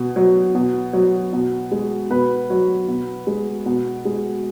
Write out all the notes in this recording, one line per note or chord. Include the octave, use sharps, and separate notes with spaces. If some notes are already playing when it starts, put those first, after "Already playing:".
Already playing: B2
F#3
B2
F#3
B2
G#3
B2 B4
F#3
B2
G#3
B2
G#3